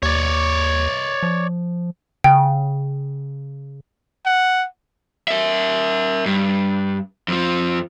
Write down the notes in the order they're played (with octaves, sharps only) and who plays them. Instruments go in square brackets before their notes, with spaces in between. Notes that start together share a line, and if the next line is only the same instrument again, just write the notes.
[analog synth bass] D#2 [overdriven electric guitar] C#5 D5
[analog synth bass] F3
[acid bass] C#3 [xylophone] G5
[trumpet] F#5
[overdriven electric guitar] A#4 E5
G2
F2 F3